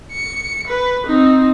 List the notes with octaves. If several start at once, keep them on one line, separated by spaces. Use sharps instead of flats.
C#7
B4
C4 D#4